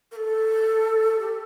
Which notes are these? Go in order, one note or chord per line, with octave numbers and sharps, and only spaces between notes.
A#4
A4
G4